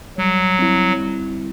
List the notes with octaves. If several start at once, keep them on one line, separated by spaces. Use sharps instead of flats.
F#3 G3
C4 E4
G3